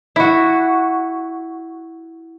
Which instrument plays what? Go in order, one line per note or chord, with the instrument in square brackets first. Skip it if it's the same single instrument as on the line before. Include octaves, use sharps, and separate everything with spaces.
[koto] E4 F#4